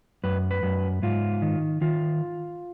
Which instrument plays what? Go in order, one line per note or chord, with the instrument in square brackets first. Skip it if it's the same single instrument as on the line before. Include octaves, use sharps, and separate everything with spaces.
[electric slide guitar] F#2 B4
B4
F#2
G#2 F4
D#3
D#3 F4